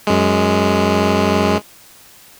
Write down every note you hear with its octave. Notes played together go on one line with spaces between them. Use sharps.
F#2 G#3